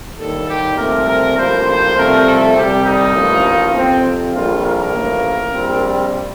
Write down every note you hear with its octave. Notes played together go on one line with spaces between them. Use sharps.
D#2 D3 G3 A4
G4
C2 A#2 F3 A3 C4 A#4
A#4
A1 G2 F3 A#3 C5
C5
C2 C3 F3 A3 C4 A#4
A4
C2 C3 G3 G4
D#4
A1 A2 F3 A#3
F2 C3 F3 C4
A#1 A2 G3 F4
A#4
A1 A2 F3 A#3
A#1 A#2 G3 C4